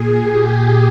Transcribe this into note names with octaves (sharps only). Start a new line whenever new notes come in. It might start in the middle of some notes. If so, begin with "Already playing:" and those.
Already playing: A#2 G#4
G4